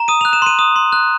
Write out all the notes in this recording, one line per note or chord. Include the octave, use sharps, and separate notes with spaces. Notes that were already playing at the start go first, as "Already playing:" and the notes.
Already playing: A#5
D#6 D#7
F7
F#6
E7
C6 D#7
D#6
C6
F#6